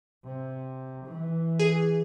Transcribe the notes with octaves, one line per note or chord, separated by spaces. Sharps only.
C3
E3
G#4